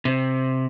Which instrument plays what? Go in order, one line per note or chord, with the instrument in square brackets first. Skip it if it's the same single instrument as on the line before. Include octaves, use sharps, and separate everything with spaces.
[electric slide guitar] C3